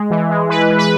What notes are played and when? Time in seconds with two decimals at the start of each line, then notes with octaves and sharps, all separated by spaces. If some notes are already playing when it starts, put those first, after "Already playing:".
Already playing: G#3
0.10 E3
0.30 G#3
0.49 E3 B4
0.69 E3
0.79 B4